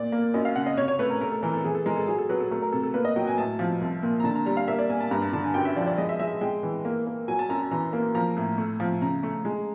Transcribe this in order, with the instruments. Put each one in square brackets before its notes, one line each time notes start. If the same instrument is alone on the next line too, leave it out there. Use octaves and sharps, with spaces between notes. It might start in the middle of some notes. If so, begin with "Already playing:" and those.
Already playing: [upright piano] A#2 D5
A#3
F#2 D#5
F5
C#3 F#5
D#5
C3 C#5
C#5
A3 B4
A#4
A3 A#4
A4
E3 A#4
A4
E3 G#4
A4
G#3 A#4
A4
F#3 G#4
A4
F#3 B4
A4
A3 A#4
A#4
C3 A4
A4
A#3 B4
D#5
F#3 G5
G#5
A2 A5
F3
C2
A#2
A#5
D3 A5
A#5
G3 A#5
F5
A#3 E5
D5
A#3 G#5
A5
G2 A#5
A5
D3 A5
G#5
F#2 G5
E5
F3 D5
D5
G#3 D#5
E5
G#3 E5
G#3 G5
E3
A#3
A#3
F#3 G#5
A5
F#2 A#5
A5
E3 A#5
A#3
F3 A#5
A2
A3
F3
C#3 A#5
A3
G#3